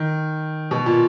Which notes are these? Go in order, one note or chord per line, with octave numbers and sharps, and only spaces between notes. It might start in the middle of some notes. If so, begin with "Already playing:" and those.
Already playing: D#3
B2
A#2